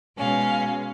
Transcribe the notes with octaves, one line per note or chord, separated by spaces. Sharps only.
B2 G#3 C#4 F5